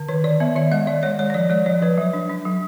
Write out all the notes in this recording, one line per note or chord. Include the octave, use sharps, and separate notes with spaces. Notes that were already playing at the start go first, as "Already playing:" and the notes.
Already playing: D3
D#3 B4
D#3 D5
B3 E5
D#3 E5
G#3 D#5
D#3 D5
G#3 C#5
G#3 C#5
C#5
F3 D5
G#3 D5
F3 C#5
F3 B4
F#3
D4
D4
F#3